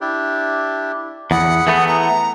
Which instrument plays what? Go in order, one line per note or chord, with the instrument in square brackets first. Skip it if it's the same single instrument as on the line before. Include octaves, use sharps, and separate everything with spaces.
[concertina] D4 E4 G4
[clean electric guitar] E2 [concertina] G#4 B5 [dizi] F#5
[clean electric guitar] E3 A3 B3
[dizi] A#5